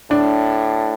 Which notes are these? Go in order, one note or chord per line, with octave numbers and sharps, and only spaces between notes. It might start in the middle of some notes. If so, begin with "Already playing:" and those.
A2 D4